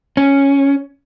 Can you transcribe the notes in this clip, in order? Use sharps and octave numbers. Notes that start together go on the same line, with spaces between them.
C#4